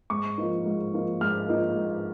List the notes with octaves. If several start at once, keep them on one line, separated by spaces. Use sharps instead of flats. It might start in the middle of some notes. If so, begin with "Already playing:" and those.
G#2 C#6
F3 A#3 D#4
G#2
F3 A#3 D#4
G#2 F6
F3 A#3 D#4
G#2